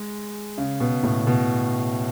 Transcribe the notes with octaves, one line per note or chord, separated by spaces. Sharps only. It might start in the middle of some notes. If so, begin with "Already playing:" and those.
Already playing: G#3
C#3
B2
A2
B2